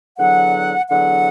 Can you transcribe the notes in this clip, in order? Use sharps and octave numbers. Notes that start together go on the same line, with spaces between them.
E2 D3 F#3 F#5
E2 D3 F#3 F#5